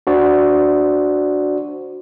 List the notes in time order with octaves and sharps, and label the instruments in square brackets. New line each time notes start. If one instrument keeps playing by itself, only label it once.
[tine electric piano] D4 F#4 C5 D5